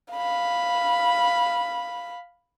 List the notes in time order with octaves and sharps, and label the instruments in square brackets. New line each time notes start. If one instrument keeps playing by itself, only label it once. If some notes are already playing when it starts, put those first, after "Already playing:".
[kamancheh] F5 B5